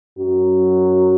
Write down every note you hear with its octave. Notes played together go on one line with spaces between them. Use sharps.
F#2 F#3